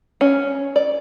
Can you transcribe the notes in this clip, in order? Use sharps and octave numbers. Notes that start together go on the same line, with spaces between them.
C#4
D5